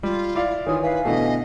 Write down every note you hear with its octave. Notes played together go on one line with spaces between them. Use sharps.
G3 F4
E4 D5 F5
D#3 E3 F4 C#5 G#5 D#6
B4 E5 F5 G#5
B2 D3 E3 A3 D#5